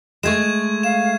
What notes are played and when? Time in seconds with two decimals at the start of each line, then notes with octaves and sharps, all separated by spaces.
0.23 G#3 A3 C#6 G#6 E7
0.83 F5 E7